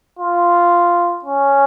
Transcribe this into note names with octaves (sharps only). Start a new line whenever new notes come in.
F4
C#4